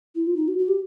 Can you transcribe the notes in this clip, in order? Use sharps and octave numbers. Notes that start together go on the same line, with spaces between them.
E4
F4
D#4
F#4
F#4
G4